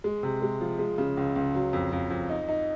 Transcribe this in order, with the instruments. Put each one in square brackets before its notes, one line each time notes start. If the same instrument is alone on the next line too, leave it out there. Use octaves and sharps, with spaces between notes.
[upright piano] G#3
C3
G#3
F3
G#3
C#3
C#2
C#2
F#3
F2
F2
F2
D#4
D#4